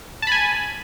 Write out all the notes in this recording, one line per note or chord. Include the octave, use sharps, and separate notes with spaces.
G#5 A5 B5